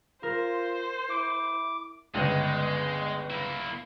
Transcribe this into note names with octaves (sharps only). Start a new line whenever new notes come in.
F4 A#4 C5
E4 D6
G1 C#2 G#3
A#3 E4